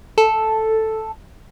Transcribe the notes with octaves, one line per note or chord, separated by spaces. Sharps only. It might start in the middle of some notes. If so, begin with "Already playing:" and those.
A4